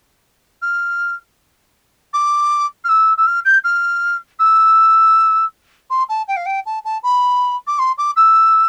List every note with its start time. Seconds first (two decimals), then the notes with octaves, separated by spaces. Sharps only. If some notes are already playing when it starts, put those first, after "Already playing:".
0.62 F6
2.14 D6
2.84 F6
2.89 E6
3.18 E6
3.27 F6
3.45 G6
3.64 F6
4.39 E6
5.90 C6
6.09 A5
6.28 G5
6.37 F5
6.46 G5
6.66 A5
6.85 A5
7.03 B5
7.67 D6
7.79 C6
7.98 D6
8.16 E6